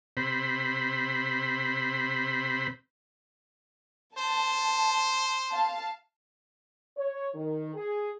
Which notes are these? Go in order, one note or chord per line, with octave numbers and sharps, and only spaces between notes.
C3 C5 B5
C5 A5
F5 A5
C#5
D#3
G#4